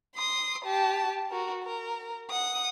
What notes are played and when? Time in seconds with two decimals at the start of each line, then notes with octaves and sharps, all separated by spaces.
0.16 C6 D#6
0.65 G4 A5
1.30 F#4 A#4
1.63 A#4
2.30 F#5 D#6